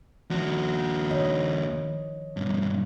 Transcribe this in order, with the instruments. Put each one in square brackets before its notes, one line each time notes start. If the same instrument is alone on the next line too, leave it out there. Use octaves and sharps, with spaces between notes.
[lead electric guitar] D#2 F#4 [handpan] F3
[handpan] D#3 C#5 D#5
[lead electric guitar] B1 G2